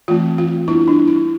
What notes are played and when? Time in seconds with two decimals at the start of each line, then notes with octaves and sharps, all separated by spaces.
0.08 E3 A3 C4 F4
0.38 F4
0.68 G3 B3 D4 E4
0.88 D4
1.08 E4